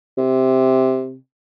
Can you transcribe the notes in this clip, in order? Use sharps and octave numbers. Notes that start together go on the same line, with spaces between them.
C3